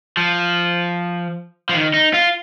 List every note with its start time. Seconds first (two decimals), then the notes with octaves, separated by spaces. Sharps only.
0.17 F3
1.69 F3
1.74 D#3
1.94 D#4
2.14 F4